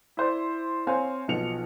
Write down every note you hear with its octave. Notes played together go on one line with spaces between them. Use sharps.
E4 C5 D5
C4 C5 C#5 F5 G#5
B1 B2 F3 C#7 F7